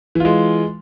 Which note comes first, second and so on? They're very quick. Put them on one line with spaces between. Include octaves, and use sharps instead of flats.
E3 F4 G#3